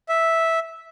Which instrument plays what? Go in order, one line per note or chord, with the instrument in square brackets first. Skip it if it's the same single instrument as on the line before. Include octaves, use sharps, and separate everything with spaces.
[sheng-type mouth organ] E5